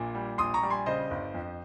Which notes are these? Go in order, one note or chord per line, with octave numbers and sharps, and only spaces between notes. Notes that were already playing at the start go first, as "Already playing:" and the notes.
Already playing: A#1 A#2
G3
A#1 C6 D#6
A#5 C#6
G3
G#5 C6
C#3 C5 D#5
G1
F2